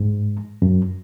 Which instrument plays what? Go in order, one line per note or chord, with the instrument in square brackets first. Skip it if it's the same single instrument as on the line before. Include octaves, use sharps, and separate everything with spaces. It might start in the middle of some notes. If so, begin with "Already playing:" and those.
Already playing: [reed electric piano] G#2
F#2